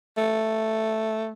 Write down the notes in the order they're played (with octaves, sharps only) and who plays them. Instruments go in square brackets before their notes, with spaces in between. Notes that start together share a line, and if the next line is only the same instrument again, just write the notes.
[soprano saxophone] A3